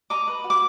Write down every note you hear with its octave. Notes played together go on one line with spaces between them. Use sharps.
D#5 A#5 D6
B4
F#4
D6